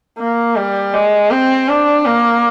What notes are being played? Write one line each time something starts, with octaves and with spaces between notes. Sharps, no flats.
A#3
G3
G#3
C4
D4
A#3